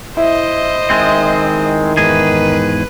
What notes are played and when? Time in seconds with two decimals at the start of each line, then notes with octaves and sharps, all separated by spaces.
0.17 E4 C5 D#5
0.90 D#3 G#3 C4
1.97 E2 G#2 G#4 B4